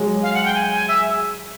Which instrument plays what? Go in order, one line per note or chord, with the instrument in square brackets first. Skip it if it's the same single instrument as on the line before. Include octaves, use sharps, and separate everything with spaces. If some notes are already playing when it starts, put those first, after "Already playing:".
Already playing: [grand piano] F#3 G#3
[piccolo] F5
F#5
G5
G#5
G#5
E5